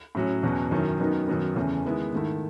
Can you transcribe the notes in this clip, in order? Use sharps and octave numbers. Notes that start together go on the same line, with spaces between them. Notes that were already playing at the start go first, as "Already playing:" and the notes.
A2 F#3 C#4
E2 B2 F#3 C#4
F#2 D#3 F#3 C#4 E4
F#2 D#3 F#3 B3 D#4
F#2 D#3 F#3 B3
E2 C#3 E3 A3 C#4
D#3 G#3 B3 E4
G#2 D#3 A3 E4